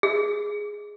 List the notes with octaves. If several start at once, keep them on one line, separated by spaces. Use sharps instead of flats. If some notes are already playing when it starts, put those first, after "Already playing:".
G#4